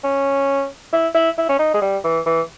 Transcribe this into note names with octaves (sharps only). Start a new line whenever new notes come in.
C#4
E4
E4
E4
C#4
D#4
G#3
G3
E3
E3